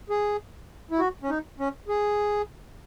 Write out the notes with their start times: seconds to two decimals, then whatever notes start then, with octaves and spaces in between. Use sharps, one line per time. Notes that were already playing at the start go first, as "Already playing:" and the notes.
0.10 G#4
0.91 E4
0.99 F#4
1.23 C#4
1.30 D#4
1.60 C#4
1.88 G#4